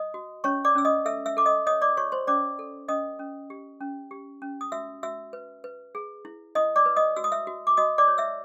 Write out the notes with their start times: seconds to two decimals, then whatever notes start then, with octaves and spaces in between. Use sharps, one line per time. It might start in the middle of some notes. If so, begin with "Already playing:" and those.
Already playing: D#5 D#6
0.14 F#4
0.44 C#4 C#5 C#6
0.65 D5 D6
0.75 C#4 E6
0.85 D#5 D#6
1.05 A4 E5 E6
1.26 E5 E6
1.37 A4 D6
1.46 D#5 D#6
1.67 C#5 D#5 D#6
1.82 D5 D6
1.97 F#4 C#5 C#6
2.12 C5 C6
2.27 C#4 D5 D6
2.59 A4
2.88 C#4 D#5 D#6
3.19 C#4
3.50 G4
3.81 C#4
4.11 G4
4.42 C#4
4.61 D#6
4.72 F#4 E5 E6
5.03 F#4 E5 E6
5.33 B4
5.64 B4
5.95 G#4
6.25 E4
6.55 E4 D#5 D#6
6.76 D5 D6
6.86 B4
6.96 D#5 D#6
7.16 F#4 E6
7.24 D#6
7.32 E5 E6
7.47 F#4
7.67 D6
7.77 F#4 D#5 D#6
7.98 D5 D6
8.08 C#5
8.18 E5 E6